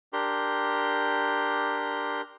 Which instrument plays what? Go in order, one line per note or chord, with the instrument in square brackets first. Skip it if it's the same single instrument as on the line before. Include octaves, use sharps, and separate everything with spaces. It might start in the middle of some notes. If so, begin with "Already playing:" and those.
[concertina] D4 G4 A#4 C6